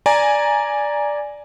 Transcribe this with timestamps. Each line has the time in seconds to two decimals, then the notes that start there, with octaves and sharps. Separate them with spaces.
0.06 D5 G#5 A#5